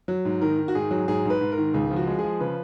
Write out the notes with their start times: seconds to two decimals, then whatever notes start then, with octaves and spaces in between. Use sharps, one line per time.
0.08 F#3
0.25 G#2
0.41 D#3 A#4
0.58 D#3
0.68 F#4
0.75 G#2 G#4
0.91 F#3
1.08 G#2 G#4
1.25 G#2 B4
1.41 G#2
1.52 A#4
1.58 D#3
1.74 C#2 G#4
1.91 F3
1.96 F#4
2.07 G#3
2.19 G#4
2.24 F3
2.40 C#3 B4